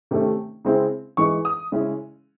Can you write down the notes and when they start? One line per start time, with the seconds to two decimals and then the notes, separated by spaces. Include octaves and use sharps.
0.11 C3 D#3 A3 C#4
0.65 C#3 G#3 C4 E4
1.17 E3 G#3 D#4 C#6
1.45 D#6
1.72 C#3 G#3 C#4 E4